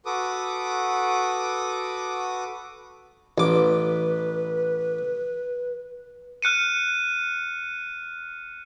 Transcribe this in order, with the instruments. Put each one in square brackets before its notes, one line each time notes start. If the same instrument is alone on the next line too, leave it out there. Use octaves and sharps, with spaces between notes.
[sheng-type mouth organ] F#4 A4 B4 D6 D#6
[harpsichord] A1 D6 [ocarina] B4
[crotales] F6 F#6 C#7 D#7